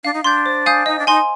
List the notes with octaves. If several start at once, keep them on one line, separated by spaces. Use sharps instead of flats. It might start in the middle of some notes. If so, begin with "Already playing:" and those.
D4 F5
D#4
D4 C6 G6
C5
F5 G#5 D#6 G6
D#4 D#5
D4
D#4 G#5 C6